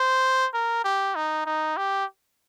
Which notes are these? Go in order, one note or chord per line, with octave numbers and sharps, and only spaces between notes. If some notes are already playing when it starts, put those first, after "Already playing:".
Already playing: C5
A#4
G4
D#4
D#4
G4